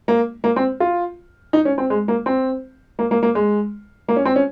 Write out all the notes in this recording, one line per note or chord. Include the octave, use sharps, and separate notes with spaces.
A#3
A#3
C4
F4
D#4
C#4
C4
G#3
A#3
C4
A#3
A#3
A#3
G#3
A#3
C#4
C4
C#4